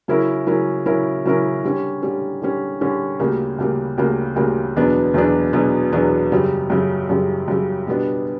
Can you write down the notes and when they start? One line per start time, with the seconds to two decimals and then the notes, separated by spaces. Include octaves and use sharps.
0.08 C#3 F#3 C#4 E4 A#4
0.46 C#3 F#3 C#4 E4 A#4
0.85 C#3 F#3 C#4 E4 A#4
1.25 C#3 F#3 C#4 E4 A#4
1.64 D3 G3 C#4
2.02 D3 G3 C#4
2.42 D3 G3 C#4
2.81 D3 G3 C#4
3.20 D2 C#3 G3 A#3
3.58 D2 C#3 G3 A#3
3.98 D2 C#3 G3 A#3
4.36 D2 C#3 G3 A#3
4.76 E2 B2 F#3 B3 D4
5.14 E2 B2 F#3 B3 D4
5.53 E2 B2 F#3 B3 D4
5.92 E2 B2 F#3 B3 D4
6.32 F#2 C#3 G3
6.70 F#2 C#3 G3
7.09 F#2 C#3 G3
7.48 F#2 C#3 G3
7.87 B2 G3 B3 D4